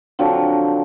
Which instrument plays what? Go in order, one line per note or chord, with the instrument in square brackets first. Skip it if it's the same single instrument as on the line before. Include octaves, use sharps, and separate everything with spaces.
[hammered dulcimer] D3 F3 F#3 C4